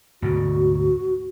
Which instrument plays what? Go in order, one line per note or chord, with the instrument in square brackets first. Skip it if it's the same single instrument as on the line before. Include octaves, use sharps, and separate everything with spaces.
[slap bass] D2 G#2 B2 [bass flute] F#4